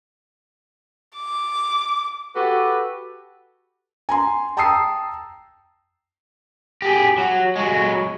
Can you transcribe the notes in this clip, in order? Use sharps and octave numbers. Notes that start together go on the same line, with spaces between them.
D6
F#4 G4 A4 B4
G#5 A#5 C6
G5 A5 A#5 D#6 E6 C7
G4 G#4
F#3
F#3 G#3